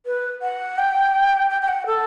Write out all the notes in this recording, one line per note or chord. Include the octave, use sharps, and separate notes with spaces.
B4
F#5
G5
G5
G5
F#5
A4